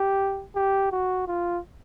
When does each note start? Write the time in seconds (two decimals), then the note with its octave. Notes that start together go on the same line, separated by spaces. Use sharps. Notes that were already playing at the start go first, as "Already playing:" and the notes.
Already playing: G4
0.56 G4
0.92 F#4
1.28 F4